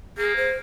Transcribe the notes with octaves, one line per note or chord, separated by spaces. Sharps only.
A#3 G#4
C5